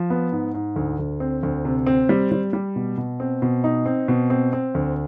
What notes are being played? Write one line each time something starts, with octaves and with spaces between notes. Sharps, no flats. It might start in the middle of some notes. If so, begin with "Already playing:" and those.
Already playing: F3
B3
G#2
G#2
D2
D2
C4
D2
C3
C4
G3
G3
G3
B2
B2
C4
B2
D#4
C4
B2
C4
C4
D2